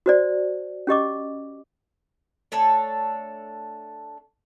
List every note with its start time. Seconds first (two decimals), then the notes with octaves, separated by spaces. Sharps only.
0.06 F#4 C5 D5
0.87 C#4 G4 D#5 D6
2.52 A3 D4 A4 C#5